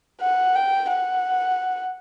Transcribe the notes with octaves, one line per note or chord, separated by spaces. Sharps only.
F#5
G5
F#5